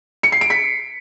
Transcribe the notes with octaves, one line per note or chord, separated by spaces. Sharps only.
C#7
C7
D7
B6